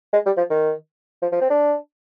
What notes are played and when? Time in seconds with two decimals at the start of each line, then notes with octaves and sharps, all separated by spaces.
0.13 G#3
0.26 G3
0.37 F3
0.50 D#3
1.22 F3
1.32 F3
1.41 C4
1.50 D4